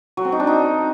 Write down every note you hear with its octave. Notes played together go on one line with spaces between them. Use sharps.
F#3
C4
D#4
D4
D#4